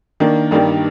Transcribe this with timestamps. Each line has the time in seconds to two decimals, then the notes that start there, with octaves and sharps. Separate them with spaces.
0.20 D#3 A#3 D4
0.51 G2 D#3 G3 A#3 D4